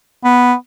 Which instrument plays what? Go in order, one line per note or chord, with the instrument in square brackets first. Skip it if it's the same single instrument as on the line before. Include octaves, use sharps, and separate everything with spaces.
[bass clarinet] B3